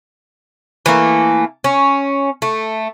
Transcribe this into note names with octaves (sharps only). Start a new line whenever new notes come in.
E3 A3 A#3
C#4
A3